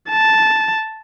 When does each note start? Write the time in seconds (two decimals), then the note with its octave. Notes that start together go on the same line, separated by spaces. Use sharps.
0.10 A5